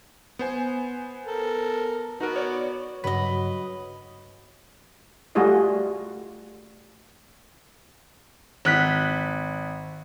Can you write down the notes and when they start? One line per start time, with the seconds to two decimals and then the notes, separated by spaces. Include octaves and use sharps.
0.39 B3 C5 G#5
1.26 A4 A#4
2.20 B3 D#4 F#4 A#4 B4
2.36 C#5 D5
3.04 G2 C#3 F#3 B4 D#5 B6
5.35 G3 A3 F4 F#4 G#4 D#5
8.65 G#1 F#6 B6